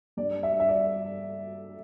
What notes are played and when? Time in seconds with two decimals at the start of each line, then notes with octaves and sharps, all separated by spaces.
0.17 G2 G3 D5
0.43 E5
0.60 E5
0.69 D5